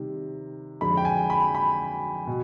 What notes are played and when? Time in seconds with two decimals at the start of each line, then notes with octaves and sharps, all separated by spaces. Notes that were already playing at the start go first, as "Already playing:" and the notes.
Already playing: C3 D#3 G3
0.81 F2 D3 G#3 B5
0.97 G5
1.05 G#5
1.30 B5
1.55 B5
2.27 B2